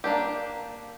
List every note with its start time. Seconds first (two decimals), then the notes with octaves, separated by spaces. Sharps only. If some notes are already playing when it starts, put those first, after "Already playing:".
0.04 A#3 D4 G4